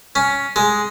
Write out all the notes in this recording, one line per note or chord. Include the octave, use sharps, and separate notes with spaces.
C#4
G#3